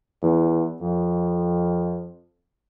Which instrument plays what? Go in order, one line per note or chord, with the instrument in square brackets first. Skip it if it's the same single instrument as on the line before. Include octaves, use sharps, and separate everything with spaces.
[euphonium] E2
F2